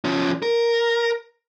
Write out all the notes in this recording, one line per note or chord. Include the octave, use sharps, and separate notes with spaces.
F3 C#4
A#4